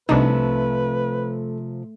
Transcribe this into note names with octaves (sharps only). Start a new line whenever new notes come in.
C2 C3 F3 A3 D4 D#4 B4